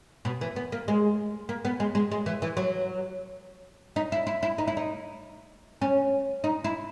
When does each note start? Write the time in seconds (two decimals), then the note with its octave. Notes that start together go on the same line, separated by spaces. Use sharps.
0.25 B2
0.41 E3
0.56 B3
0.72 A#3
0.88 G#3
1.49 A#3
1.65 B3
1.80 G#3
1.95 G#3
2.12 G#3
2.26 E3
2.42 E3
2.57 F#3
3.96 D#4
4.12 E4
4.27 E4
4.43 E4
4.58 D#4
4.67 E4
4.77 D#4
5.81 C#4
6.44 D#4
6.64 E4